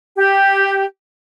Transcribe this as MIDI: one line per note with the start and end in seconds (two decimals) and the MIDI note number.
0.16 0.84 67